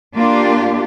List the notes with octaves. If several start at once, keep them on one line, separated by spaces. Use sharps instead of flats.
A#3 D4 F4 G4 D5